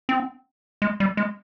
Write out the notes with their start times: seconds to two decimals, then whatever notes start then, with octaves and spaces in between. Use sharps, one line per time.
0.09 C4
0.82 G#3
1.00 G3
1.17 G#3